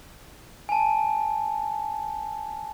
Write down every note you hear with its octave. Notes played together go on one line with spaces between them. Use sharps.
G#5 A5